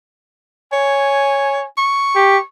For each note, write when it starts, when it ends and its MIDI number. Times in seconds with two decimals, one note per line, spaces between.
0.72 1.63 73
0.72 1.67 80
1.78 2.42 85
2.15 2.37 67